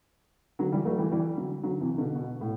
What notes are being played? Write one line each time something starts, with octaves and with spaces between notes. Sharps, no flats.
D3 F#3
E3 G3
F#3 A3
E3 G3
E3 G3
D3 F#3
D3 F#3
C3 E3
B2 D3
B2
A2